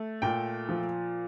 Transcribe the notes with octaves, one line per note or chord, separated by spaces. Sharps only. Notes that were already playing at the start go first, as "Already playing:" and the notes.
Already playing: A3
A#2 G5
F3